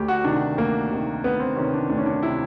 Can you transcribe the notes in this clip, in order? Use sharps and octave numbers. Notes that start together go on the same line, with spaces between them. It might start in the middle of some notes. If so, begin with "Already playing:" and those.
Already playing: D2 G4
F#4
C3 D#3 D4
D2 A#3
C3 D#3
D2 B3
C4
C3 D#3 C#4
D4
D2 D4
C#4
D4
C3 D#3 E4